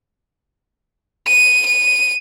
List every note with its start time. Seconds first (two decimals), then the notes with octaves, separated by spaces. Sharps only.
1.28 D#7
1.67 D#7